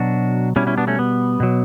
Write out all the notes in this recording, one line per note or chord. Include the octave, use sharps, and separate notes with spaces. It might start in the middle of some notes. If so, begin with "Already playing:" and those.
Already playing: B2 F#3 D4 F#4
B2 G3 C#4 E4
C#4 E4
B3 D4
A3 C#4
B3
B2 F#3